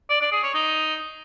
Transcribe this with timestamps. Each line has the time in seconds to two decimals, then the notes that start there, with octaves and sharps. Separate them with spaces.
0.10 D5
0.21 D5
0.32 G#4
0.43 C#5
0.54 D#4